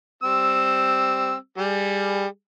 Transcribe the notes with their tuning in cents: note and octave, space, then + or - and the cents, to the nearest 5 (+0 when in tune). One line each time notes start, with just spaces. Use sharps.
G3 +0 C4 +0 E6 +0
G3 +20 G#4 +5